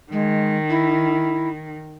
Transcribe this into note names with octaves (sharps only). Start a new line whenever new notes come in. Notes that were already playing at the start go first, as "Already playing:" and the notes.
D#3 G#3
E4